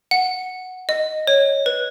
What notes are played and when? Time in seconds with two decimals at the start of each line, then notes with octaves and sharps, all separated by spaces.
0.11 F#5
0.89 D#5
1.27 C#5
1.66 B4